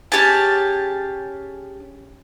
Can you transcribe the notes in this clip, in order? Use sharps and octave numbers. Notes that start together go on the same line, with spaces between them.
C#4 G4 G#4 A5